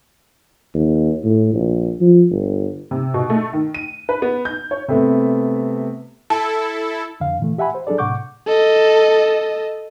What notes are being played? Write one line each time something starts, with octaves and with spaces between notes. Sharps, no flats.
D#2
A2
A#1
F3
G1
C3
B2
A3
D#3
D#7
B4
B3
G6
C#5
C3 A3 B3
E4 A4 A5
F2 D3 F5
A#2 E3 A3
G4 E5 F#5 G#5 B5
C5
F#3 D4 G#4 A4 D5
A2 C3 F#5 C#6 D6 G6
A4 D#5